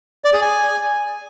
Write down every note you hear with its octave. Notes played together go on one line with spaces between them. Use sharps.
D5
G#4
G#5